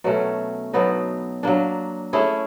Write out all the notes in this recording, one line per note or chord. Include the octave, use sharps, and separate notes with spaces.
B2 F#3 A3 C#4
B2 F#3 B3 D#4
F#3 A#3 D4
A3 C#4 E4 G#4